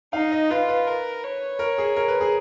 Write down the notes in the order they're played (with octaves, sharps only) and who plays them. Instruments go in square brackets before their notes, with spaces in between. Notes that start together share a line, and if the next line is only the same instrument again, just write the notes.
[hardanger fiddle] D#4 [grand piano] F5
[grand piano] D#5
[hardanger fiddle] F4 [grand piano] B4
[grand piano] B4
[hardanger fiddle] A#4
C#5
[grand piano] A#4
G#4
A#4
B4
G#4